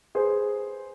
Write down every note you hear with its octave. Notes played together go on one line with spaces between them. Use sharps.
G#4 B4 C5